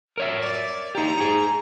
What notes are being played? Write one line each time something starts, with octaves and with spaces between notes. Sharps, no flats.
A#4 C#5 E5
D5
D#4 G4 A#5
D#4 G#4